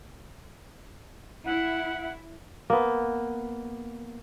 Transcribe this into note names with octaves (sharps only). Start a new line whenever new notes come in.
E4 F#5
A#3 B3